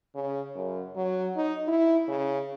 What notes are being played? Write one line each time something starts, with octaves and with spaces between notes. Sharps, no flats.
C#3
F#2
F#3
D#4
E4
C#3